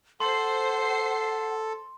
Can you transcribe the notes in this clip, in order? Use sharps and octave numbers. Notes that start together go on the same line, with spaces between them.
A4 C5 F#5 C6 C7